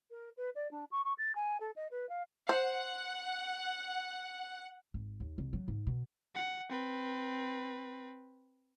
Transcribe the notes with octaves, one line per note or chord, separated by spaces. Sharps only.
A#4
B4
D5
D4
C#6
C#6
A6
G#5
A4
D#5
B4
F5
C5 F#5
G#1
D#2
C2
F#3
G#2
B2
F#5
C4 B4